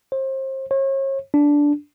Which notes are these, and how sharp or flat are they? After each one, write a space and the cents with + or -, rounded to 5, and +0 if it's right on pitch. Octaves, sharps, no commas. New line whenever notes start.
C5 +30
C#5 -40
D4 -10